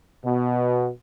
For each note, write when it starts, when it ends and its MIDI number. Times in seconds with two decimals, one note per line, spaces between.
0.24 0.88 47